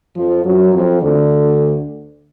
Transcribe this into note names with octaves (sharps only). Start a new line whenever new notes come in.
F2 F3
F#2 F#3
F2 F3
D2 D3